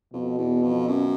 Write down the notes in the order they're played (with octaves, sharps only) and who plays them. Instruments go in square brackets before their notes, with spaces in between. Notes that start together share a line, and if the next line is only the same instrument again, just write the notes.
[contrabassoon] F2 [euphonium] B2
[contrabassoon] E2
F2
F#2